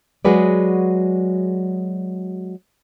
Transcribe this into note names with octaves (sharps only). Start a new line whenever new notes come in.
F#3 G#3 F#4 G#4 B4 D5